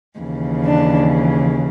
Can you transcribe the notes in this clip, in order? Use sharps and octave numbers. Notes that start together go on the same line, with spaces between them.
D#2 C#3 E3
D4